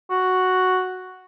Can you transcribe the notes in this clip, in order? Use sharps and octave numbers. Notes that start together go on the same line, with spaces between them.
F#4